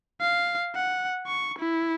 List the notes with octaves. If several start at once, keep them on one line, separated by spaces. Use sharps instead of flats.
F5
F#5
C#6
E4